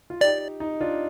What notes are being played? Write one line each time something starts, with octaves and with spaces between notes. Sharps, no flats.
F4
D#4 G4 D5
D#4
D4 F4